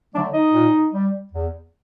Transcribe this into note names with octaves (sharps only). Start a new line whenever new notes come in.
D3 F#3 A3 D4 D5
D#4 D#5
A#2
G3
E2